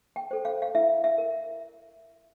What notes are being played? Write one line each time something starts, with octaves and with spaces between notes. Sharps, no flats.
G5
A4 C5
F5
F5
E4 E5
E5
A#4